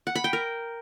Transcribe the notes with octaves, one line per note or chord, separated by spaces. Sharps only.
F#5
B5
G5
A#4